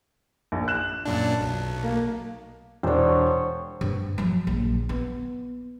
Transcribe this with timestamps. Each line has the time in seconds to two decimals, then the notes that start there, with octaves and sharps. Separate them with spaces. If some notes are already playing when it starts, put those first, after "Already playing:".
0.52 A#1
0.68 F#6 E7
1.06 F#2 A#2 D4 A5
1.41 B1
1.83 A#3
2.83 E1 D4 C5 C#5
3.81 G2
4.18 F3 F#3
4.47 A#1
4.89 B3